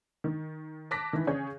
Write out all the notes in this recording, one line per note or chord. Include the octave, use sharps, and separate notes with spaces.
D#3
A5 D6 F#6 A#6 B6
D#3 E3
C#3 G#4 C#5 G6